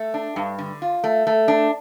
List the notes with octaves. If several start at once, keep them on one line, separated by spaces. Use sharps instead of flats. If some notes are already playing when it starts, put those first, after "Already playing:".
Already playing: A3
D4
G2
D3
F4
A3
A3
D4